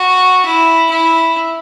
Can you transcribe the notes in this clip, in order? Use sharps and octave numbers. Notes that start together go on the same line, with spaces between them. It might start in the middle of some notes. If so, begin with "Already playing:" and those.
Already playing: F#4
E4
E4